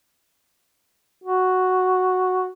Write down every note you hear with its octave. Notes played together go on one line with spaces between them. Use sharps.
F#4